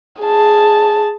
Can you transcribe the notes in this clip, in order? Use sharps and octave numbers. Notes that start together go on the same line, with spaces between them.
G#4 A5